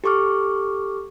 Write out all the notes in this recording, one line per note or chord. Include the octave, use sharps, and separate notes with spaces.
G4 A4 C#6 D6 F6